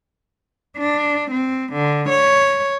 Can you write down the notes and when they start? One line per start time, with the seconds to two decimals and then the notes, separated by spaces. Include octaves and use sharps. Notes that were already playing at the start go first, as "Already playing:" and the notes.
0.78 D4
1.31 C4
1.73 D3
2.09 C#5